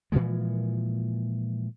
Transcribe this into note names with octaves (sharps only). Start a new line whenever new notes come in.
A#2 E3 F3 G#3